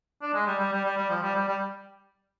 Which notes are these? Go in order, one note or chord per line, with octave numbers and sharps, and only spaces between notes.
D4
G#3
G3
G3
G3
G3
G3
F3
G3
G3
G3